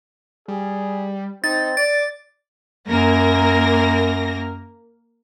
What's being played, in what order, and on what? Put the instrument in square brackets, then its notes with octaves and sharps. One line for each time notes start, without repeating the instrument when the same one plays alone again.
[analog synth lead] G3 [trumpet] G#4
[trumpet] C4 [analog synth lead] D#4 [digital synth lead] A6
[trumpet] D5 [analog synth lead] D6 [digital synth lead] A6
[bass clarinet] F#2 [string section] A#3 A#4 A#6